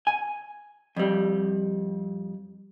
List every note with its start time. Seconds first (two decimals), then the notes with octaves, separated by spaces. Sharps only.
0.07 G#5
0.96 F2 G3